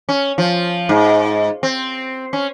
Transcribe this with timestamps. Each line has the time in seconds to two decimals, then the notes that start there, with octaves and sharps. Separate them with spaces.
0.09 C#4
0.38 F3
0.89 G#2
1.63 C4
2.33 C#4